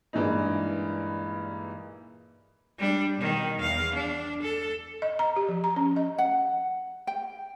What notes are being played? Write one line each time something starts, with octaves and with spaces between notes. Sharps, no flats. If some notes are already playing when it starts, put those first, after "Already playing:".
G2 A#2 E3 G#3 D4 D#4
G3 D4
B2 D#3
E2 F5
D4
A4
D#5
A#5
G4
F3
A#5
C#4
D#5
F#5
G5